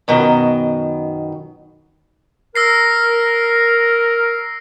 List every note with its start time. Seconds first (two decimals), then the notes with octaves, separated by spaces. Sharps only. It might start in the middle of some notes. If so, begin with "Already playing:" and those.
0.08 F#2 B2 D#3
2.55 A#4 E6 A#6 C7